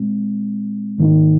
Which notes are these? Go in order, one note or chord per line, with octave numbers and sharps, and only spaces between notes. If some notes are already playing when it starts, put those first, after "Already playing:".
Already playing: A#2 G#3 C4
G#2 D#3 A#3 D#4